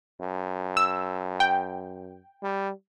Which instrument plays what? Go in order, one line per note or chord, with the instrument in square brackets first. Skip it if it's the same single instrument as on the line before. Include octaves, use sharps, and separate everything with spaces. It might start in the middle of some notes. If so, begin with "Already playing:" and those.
[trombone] F#2
[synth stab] E6
G5
[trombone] G3